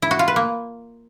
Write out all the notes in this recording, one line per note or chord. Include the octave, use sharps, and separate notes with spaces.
E4
F#4
F4
B4
A#3